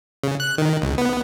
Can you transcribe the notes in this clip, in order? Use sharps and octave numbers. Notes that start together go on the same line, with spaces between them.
C#3
F#6
D#3
C#2
B3